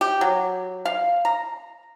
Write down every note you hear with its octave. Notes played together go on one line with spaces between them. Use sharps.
G4
F#3
F5
A#5